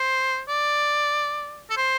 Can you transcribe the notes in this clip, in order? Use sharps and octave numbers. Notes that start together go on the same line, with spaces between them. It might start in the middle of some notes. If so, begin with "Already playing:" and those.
Already playing: C5
D5
A4
C5